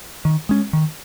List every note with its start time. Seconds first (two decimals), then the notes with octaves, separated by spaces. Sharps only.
0.25 D#3
0.49 G#3 C#4
0.73 D#3